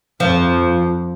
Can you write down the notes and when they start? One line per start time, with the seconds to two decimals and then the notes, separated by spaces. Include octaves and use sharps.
0.20 F2 F3